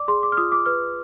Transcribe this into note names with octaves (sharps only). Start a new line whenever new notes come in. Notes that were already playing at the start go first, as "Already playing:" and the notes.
Already playing: D5 D6
G#4 C6
D6
F6
F4 D#6
D6
B4 F6